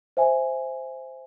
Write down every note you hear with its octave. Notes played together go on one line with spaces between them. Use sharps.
C5 E5 G#5